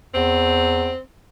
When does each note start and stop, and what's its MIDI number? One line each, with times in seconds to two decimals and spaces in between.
0.14 0.92 40
0.14 0.99 60